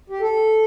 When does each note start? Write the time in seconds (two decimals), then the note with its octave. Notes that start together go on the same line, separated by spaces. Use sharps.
0.10 G4
0.21 A4